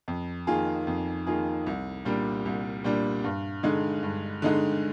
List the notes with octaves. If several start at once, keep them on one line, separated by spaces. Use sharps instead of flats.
F2
D#3 A#3 F4 G#4
F2
D#3 A#3 F4 G#4
C2
A#2 G3 D4
C2
A#2 G3 D4
G2
D3 G#3 D#4
G2
D3 G#3 D#4